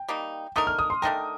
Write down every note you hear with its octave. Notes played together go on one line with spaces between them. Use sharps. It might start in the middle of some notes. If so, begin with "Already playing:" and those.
Already playing: G5
G3 A#3 D#4
D3 A3 D#4 A#4 D#6
F6
D#6
C6
D3 A3 D#4 A#4 G5